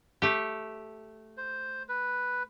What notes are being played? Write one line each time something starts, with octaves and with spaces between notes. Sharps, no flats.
A3 G4
C5
B4